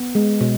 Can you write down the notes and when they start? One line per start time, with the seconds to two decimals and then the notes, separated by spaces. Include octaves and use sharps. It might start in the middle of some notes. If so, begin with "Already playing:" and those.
Already playing: B3
0.15 G#3
0.41 B2